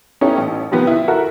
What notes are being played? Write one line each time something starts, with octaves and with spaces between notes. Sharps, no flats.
B3 C#4 D#4 E4 G4 A4
A1
C3 D#3 F3 B3
E4
F#4 A4 A#4 E5 F#5